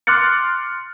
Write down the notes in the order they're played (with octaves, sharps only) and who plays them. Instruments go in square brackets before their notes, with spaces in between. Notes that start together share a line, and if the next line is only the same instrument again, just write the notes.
[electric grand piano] C6 D6 F6 F#6 A6 C#7